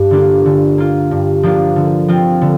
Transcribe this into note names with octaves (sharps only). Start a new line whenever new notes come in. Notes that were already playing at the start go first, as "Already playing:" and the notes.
Already playing: G2
D3 A#3 D4 F4
D3
A#3 F4
G2
F3 A#3 D4 F4
D3
F3 C4 F4
D3